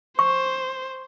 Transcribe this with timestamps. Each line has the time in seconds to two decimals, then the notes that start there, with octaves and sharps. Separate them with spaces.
0.19 C5 C#6